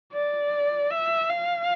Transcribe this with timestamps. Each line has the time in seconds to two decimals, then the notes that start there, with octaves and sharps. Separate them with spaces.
0.13 D5
0.91 E5
1.30 F5